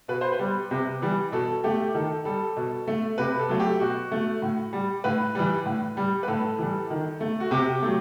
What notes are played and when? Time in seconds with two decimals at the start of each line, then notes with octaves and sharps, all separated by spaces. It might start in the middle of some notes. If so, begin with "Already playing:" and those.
0.08 B2 B4
0.21 C5
0.32 B4
0.39 G3
0.71 C3
1.02 E3 G3
1.32 B2 A4
1.64 A3 G4
1.94 D#3 A4
2.25 G3 A4
2.57 B2
2.87 A3
3.18 C3 B4
3.39 A4
3.49 F#3 A3
3.60 G4
3.80 B2 F#4
4.12 A3
4.42 A2
4.73 G3
5.04 A2 B4
5.35 E3 G3
5.66 A2
5.97 G3
6.23 B4
6.28 A2 A4
6.58 E3 G3
6.90 D#3
7.21 A3
7.40 F#4
7.51 C3 G4
7.82 F#3 A3